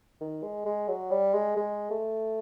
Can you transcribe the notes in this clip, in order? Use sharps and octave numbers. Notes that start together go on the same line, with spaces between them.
D#3
G#3
G#3
F#3
G3
G#3
G#3
A3